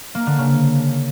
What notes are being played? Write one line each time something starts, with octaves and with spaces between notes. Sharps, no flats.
A#3
D3
C#3